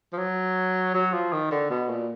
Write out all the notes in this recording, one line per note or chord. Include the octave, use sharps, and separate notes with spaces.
F3
F#3
F#3
F3
D#3
D3
B2
A#2